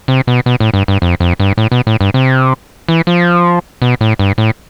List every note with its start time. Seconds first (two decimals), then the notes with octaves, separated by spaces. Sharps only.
0.08 C3
0.27 B2
0.46 B2
0.60 A2
0.74 G2
0.88 G2
1.02 F2
1.20 F2
1.40 G2
1.58 A2
1.72 B2
1.87 A2
2.01 G2
2.14 C3
2.89 E3
3.07 F3
3.82 B2
4.01 A2
4.19 G2
4.38 A2